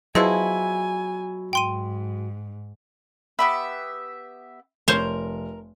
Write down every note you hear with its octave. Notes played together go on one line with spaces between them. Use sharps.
B2 F3 F#3 E4 G#4 G#5
G#2 G5 C6 D#7
B3 G4 E5 B5
F1 A#4 C5 C#5